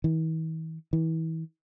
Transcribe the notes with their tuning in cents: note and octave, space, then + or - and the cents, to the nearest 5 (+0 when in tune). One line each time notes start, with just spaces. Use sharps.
E3 -45
E3 -35